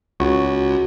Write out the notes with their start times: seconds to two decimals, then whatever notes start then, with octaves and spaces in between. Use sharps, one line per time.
0.20 C#2 F#4 C#5